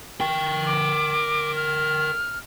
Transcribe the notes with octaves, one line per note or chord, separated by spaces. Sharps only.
A#4 G5
D6
F6